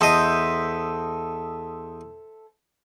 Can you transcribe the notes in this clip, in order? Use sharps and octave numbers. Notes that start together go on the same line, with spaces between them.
E2 A4 C5 D#5 E5 C6 D#6